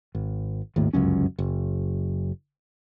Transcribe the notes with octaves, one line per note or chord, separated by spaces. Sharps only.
G#1
G#1 D#2 A2
G1 C#2 F#2 C#4
F#1